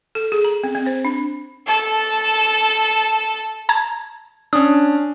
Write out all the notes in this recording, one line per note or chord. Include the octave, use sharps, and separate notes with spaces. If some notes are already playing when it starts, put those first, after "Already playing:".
A4
G#4
A#5
C4
C4
C5
D4
A4 A5
A5 A#5 G#6
C#4 D4 D#6